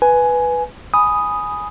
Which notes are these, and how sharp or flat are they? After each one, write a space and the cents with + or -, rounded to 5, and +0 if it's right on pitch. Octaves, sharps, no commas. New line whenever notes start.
B4 +0 G#5 +10
G#5 +0 B5 +0 D#6 +0